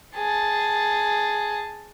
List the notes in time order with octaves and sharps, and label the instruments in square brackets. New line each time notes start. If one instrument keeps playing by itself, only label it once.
[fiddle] G#4 A5